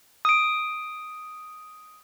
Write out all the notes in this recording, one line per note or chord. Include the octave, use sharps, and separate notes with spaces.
D#6 D7